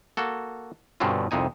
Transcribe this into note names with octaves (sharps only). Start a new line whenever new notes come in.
A#3 F#4 A4
G2 B2 D3 C4 C#4 F4
C2 F2 C3 D#4 G#5